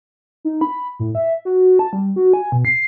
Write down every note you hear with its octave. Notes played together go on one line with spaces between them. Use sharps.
D#4
B5
A2
E5
F#4
A5
G3
F#4
G#5
B2
C7